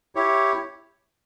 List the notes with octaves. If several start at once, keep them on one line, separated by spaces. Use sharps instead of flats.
E4 G4 C#5